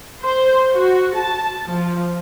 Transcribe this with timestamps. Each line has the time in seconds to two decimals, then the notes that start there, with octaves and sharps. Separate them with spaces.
0.24 C5
0.72 F#4
1.15 A5
1.66 F3